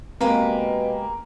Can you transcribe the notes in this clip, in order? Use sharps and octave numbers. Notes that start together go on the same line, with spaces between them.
B2 G#3 A#3 C4 G4 B4